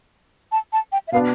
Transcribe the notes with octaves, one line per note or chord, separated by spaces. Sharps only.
A5
A5
G5
E5
B2 B3 D4 F5